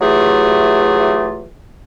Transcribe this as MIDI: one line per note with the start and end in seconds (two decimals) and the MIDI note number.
0.01 1.48 52
0.01 1.48 54
0.01 1.48 57
0.01 1.48 65
0.01 1.48 67
0.01 1.48 68